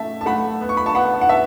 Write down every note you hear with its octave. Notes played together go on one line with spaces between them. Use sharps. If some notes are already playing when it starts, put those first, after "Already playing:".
Already playing: A3 C#4 E5 A5
A5
A3 F#5 B5
B3
C#6
B5
A5 C#6
B3 F#5 B5
F#5
B3 E5 A5